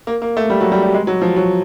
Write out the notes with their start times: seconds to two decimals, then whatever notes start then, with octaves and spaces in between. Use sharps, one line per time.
0.07 A#3
0.22 A#3
0.37 A3
0.50 G3
0.61 F#3
0.72 G3
0.82 G3
0.94 G#3
1.07 F#3
1.22 F3
1.36 F#3